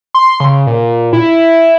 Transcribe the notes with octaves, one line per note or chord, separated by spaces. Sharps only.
C6
C#3
A#2
E4